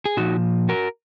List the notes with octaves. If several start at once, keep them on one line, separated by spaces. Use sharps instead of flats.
G#4
A#2 F3 D#4 F#4
F#4 A#4